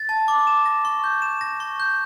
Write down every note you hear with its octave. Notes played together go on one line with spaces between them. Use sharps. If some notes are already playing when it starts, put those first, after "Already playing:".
Already playing: A6
A5
D6
E7
A#6
C#6
G6
E7
A#6
C#6
G6